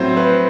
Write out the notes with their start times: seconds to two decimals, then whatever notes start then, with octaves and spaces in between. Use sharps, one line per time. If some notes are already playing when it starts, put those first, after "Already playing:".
Already playing: A2 F#3 C4 C5
0.17 B4